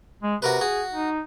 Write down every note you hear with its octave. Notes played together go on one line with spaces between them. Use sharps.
G#3
C3 F#4 A#4 B4
F#4 G#4
D#4